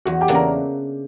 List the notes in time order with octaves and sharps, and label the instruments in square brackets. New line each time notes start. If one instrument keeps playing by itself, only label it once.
[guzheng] E2 [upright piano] F#4 F#5
[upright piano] G4 G5
[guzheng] C#3 E3 A#3 D4
[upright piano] A#4 A#5